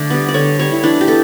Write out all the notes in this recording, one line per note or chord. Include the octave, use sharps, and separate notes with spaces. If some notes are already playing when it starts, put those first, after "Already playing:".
Already playing: D3 A3 D5
G3 B3
D5
D3 C#5
G3 B3 C#5
E4
E3 D4
G4
B3 A4